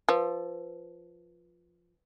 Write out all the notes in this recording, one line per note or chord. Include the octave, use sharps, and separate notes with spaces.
F3 B4